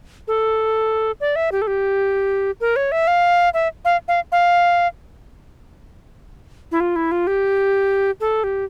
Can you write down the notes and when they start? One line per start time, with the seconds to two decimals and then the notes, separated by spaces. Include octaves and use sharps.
0.28 A4
1.20 D5
1.36 E5
1.52 G4
1.62 A4
1.67 G4
2.60 A#4
2.76 C#5
2.92 E5
3.07 F5
3.54 E5
3.85 F5
4.08 F5
4.32 F5
6.71 E4
6.80 F4
6.96 E4
7.11 F4
7.27 G4
8.20 A4
8.44 G4